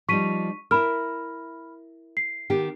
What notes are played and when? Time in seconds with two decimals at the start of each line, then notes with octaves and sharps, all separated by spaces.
0.09 F3 G3 D#4 C#6 B6 D#7
0.71 E4 A#4 B5 F6
2.17 C7
2.50 D#3 B3 G4